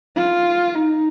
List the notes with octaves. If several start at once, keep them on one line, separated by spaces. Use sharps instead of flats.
F4
D#4